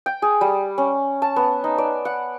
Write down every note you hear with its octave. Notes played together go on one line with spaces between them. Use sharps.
G5
G#4
G3
C#4
A5
B3
D#4
D5
F#5